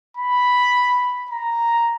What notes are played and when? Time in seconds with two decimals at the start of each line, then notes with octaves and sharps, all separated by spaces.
0.17 B5
1.31 A#5